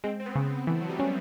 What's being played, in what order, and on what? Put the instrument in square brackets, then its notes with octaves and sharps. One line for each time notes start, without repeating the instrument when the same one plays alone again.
[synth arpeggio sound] G#3 [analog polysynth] C4
[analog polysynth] C4
B3
[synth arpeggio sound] C#3
[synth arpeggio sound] E3 [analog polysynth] A3
[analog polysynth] F#3
G3
[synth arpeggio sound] C#4